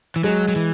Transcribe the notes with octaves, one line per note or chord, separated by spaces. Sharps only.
E3
F#3 G#3
F#3
E3